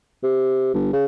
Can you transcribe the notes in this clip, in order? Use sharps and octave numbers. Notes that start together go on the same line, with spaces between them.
C3
G1
C#3